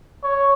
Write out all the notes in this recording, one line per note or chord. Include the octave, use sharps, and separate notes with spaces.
C#5